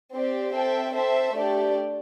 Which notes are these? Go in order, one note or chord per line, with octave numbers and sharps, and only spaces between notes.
C4 G4 D5
C4 A4 E5 G5
C4 A4 C5 E5
A3 D4 G4 D5